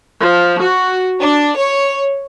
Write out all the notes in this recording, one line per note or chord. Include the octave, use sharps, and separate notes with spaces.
F3
F#4
D4
C#5